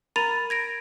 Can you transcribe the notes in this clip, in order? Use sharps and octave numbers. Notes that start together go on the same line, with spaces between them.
A#4 A#5 B5 A6 D#7 F7
G#6 A#6 D7